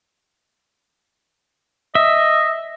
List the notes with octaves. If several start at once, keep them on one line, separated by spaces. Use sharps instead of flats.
D#5 E5